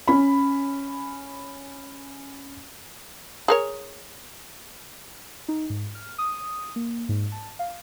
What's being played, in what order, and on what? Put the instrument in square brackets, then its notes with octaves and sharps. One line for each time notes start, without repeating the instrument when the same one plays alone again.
[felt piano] C#4 B5
[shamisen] G#4 A#4 C#5
[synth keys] D#4
G#2
F6
D#6
A#3
G#2
A5
F5